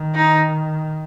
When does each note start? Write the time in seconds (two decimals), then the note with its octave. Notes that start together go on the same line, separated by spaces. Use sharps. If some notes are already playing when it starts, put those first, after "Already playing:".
Already playing: D#3
0.15 D#4